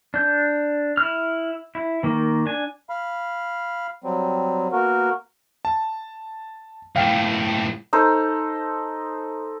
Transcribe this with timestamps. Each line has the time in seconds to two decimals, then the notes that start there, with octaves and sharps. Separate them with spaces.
0.14 D4 G6
0.97 E4 F6
1.75 E4
2.03 D#3 A#3
2.46 D4 G#5
2.90 F5 B5
4.04 F#3 G3 C4
4.72 A#3 B3 F#4 A#4
5.65 A5
6.96 C#2 A2 F5 G5
7.93 D#4 A4 C5